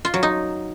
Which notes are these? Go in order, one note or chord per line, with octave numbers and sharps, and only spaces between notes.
F4
F#3
D#4